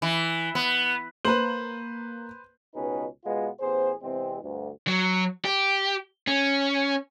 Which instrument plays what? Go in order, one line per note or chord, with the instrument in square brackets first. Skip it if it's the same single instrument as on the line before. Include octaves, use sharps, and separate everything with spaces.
[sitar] E3
B3
[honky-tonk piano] A#3 F#7 [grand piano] B4 C5
[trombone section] C#2 B2 C#4 D#4 G#4 B4
B2 G#3 B3 F4
A1 B3 G#4 C5
E2 C3 G#3 C4
D2 G2
[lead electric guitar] F#3
G4
C#4